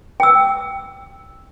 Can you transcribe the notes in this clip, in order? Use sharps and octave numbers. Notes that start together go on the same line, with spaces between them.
G5 E6